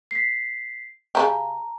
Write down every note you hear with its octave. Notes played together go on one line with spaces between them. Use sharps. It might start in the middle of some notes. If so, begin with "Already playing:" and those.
B6 C7
C#3 E3 G4 A5 A#5